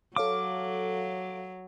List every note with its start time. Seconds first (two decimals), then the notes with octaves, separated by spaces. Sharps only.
0.16 F#3 A4 C#5 F5 D6